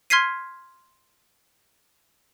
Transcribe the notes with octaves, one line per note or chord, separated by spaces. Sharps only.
C6 F6 G#6 B6 C7 D#7